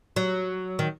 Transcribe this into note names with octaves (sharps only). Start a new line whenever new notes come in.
F#3
D#3